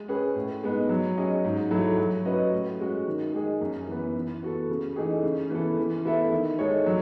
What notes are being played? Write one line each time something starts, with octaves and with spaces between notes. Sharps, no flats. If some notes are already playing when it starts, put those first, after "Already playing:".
Already playing: G#3
C#4 G#4 B4
A2
G#3 B3 D#4
F#3
C#4 G#4 D#5
G#2
F#3 A3 E4
F#3
C#4 F#4 B4 D#5
A2
G#3 C#4 F#4
D#3
G#3 D#4 G#4
F#2
E3 B3
E3
B3 F#4 A4
C#3
E3 A3 D#4 G#4
C#3
E3 B3 E4 A4
E3
B3 E4 A4 E5
D#3
G#3 D#4 A4 C#5
F#3